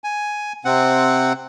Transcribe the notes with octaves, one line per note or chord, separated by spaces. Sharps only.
G#5
C3 C4 F#5